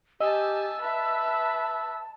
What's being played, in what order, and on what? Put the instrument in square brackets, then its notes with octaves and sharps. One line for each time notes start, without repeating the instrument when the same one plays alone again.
[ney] G4 [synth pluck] D#5 [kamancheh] G#5 A5 [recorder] E6
[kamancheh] B4 E5 [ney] A5